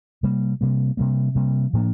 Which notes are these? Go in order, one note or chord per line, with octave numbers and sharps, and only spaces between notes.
C3 G3 A#3
C3 G3 A#3
C3 G3 A#3
C3 G3 A#3
A2 F3 A#3 D4